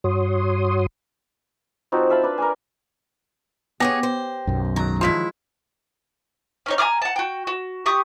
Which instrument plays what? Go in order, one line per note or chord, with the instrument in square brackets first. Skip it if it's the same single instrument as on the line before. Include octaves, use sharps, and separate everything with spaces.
[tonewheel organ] G2 F#4 C#5 C6 D#6
[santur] F3 C4 D#4 F#4
E5 F5 A5 B5
D4 B4
A#4 D5 G#5
[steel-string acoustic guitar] B3 G#4 C#5 [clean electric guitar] G4 [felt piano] A#6
[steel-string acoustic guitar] C5
[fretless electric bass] B1 F#2
[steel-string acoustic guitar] G#2 A#5 [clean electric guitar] D#3 F#3
[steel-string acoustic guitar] F3 G#3 E4 [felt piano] C6 B6
[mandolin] C#4 D#4 C#5
G#5 A#5 D6 F6
F#5 A5
F#4 G5
F#4
G4 C#6 D#6